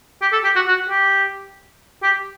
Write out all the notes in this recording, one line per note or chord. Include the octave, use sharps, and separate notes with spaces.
G4
A4
G4
F#4
F#4
G4
G4